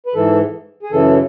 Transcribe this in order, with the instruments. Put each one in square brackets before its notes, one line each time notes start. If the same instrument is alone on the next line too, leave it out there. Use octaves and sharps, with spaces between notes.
[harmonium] B4
G#2 E3 A4
G#4
F#2 C#3 E3 A4